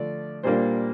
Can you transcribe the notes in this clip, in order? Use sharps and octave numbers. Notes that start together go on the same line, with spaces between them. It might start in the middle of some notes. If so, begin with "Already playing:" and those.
Already playing: D3 F3 A3 D4 D5
A#2 G3 A#3 D4 C5